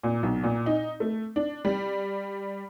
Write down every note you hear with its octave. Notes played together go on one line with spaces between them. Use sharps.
A#2
B1
A#2
D#4
A3
D4
G3